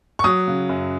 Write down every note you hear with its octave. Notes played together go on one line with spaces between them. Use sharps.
C#6
F#3 D#6
C#3
F#2